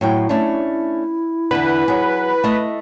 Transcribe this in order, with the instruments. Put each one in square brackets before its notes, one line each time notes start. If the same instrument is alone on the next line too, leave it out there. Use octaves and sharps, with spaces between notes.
[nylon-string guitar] A2 F#3 G5 [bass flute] E4
[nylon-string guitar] A3 C#4 D4
[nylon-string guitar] E2 D3 [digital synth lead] B4
[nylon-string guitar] F#3 G#4
A3 D#5